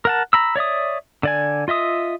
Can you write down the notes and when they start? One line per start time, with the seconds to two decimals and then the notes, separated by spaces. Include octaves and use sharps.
0.05 A#4 F#5 A5
0.33 A#5 B5 E6
0.56 C#5 D5 E5 D#6
1.23 D3 D5 G#5
1.68 F4 D#5 E5 D#6